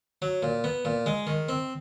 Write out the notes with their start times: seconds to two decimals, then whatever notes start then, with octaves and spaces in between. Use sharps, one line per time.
0.22 F#3
0.43 A#2
0.64 B3
0.85 A#2
1.06 G#3
1.27 D#3
1.49 C4